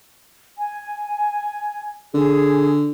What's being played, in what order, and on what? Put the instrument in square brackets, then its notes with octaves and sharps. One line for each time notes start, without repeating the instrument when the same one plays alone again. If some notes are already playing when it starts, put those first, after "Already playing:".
[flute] G#5
[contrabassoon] D3 [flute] G#4